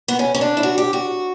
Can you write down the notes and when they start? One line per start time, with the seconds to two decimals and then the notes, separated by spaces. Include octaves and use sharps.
0.08 B3
0.19 C#4
0.35 C#4
0.41 D4
0.57 E4
0.63 F#4
0.78 G4
0.93 F#4